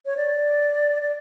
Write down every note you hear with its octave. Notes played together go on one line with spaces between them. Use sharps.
C#5
D5
D5